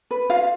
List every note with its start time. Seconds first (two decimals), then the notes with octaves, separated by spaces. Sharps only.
0.11 B4
0.30 F4 F5